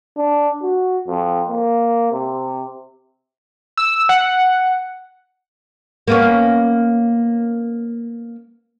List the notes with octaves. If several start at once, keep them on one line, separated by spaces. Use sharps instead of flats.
D4
F#4
F2
A#3
C3
E6
F#5
A#3 B3 C#4